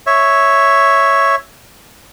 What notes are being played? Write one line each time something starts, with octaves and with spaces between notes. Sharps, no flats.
C#5 E5